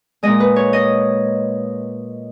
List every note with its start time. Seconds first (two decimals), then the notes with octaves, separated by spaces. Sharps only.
0.23 A#2 G#3 D#5
0.40 B4
0.56 C#5
0.73 D#5